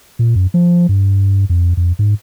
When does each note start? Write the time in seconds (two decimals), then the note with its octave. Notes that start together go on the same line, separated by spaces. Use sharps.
0.19 A#2
0.35 F#2
0.54 F3
0.89 G2
1.50 F2
1.77 F2
1.99 G#2